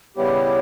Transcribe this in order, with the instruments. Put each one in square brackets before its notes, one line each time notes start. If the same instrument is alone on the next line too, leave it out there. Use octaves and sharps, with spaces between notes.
[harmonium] C#3 G3 B3 E4 G4 [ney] C#5